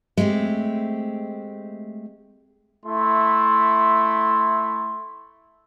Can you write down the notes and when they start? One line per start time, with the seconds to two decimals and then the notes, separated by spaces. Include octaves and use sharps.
0.17 G#3 A3 C4 G4
2.85 A3 E4 C6